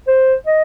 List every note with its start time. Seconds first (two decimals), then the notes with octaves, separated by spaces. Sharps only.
0.07 C5
0.47 D#5